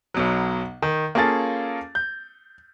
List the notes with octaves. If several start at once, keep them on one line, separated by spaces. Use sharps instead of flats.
B1 B2 F#3
D#3
A#3 C#4 F4 G#4 A4 A6
G6